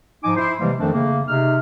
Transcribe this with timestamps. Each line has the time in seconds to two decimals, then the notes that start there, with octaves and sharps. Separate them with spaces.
0.24 G#2 F3 D#4 G#5 D6
0.37 E4 C5 C6
0.60 C3 E3 F3 G3 G#3 A#3
0.79 F2 D#3 F3 A3 C4 D4
0.93 C#3 A3 A#3
1.28 C3 D#4 F6